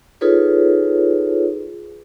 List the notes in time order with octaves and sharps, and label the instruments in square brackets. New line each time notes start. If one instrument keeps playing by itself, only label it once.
[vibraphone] D#4 F4 G#4 A4 B4 C#5